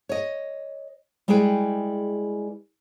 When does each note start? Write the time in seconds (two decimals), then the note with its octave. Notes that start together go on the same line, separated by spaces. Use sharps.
0.09 C#5 D#5
1.28 G3 G#3 E4 G#4 B4 G5